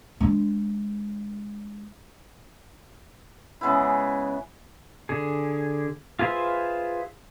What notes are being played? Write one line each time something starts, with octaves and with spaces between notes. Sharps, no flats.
G#3 D4
C#3 G#3 B3 E4
D3 G#4
F4 G#4 B4 C5 E5